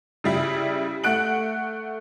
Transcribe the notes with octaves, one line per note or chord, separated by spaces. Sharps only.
C#3 G3 E4
A3 F#5 F#6 D7 F#7